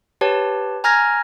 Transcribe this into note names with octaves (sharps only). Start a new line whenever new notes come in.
G4 B4 C#5 A5
G#5 A#5 F6 G#6 A#6